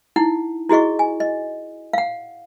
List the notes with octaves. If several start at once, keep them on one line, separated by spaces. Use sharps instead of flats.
D#4 E4 F#5
E4 F#4 G#4 D#5 C#6
G#5
D#5
F5 F#5